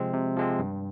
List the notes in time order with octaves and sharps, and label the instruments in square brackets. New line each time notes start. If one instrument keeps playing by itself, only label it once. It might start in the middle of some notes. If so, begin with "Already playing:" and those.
Already playing: [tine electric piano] C3 F3 G#3 C4
C3
F3 G#3 C4
G2